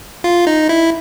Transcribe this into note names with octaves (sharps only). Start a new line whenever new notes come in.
F4
D#4
E4